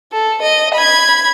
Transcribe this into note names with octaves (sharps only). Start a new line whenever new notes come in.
A4
D#5
B5 G#6